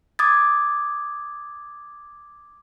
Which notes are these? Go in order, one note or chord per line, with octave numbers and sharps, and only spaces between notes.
D6 D#6 G#6 A6